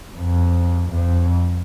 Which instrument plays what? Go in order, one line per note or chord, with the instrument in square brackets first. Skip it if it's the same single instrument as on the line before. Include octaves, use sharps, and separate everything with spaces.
[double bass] F2
F2